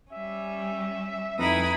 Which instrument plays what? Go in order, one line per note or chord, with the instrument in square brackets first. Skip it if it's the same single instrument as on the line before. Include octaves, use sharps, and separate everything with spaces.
[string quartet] G3 C#4 [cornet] E5
[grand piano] F2 [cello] D#4 E4 [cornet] B4 [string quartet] G#5 B5 D#6